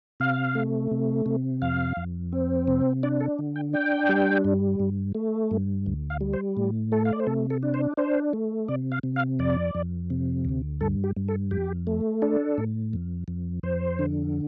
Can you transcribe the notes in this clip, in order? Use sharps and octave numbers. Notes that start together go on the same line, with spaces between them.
C3 F5
A3
C3
C3
F2 F5
F2
C4
C3
D4 D5
A4
D3
G5
D4 G5
G3
G2
G2
A3
G2
D2
F5
G3
C5
A2
A3 A4
F5
D5
C5
C3 A4
A4
D4
C5
D4 C5
A3
C3 D5
F5
C3
F5
F2 D5
F2
C3
D2
G2 A4
G4
G2
A4
F2 G4
A3
D4 A4
A2
F2
F2
F2 C5
D3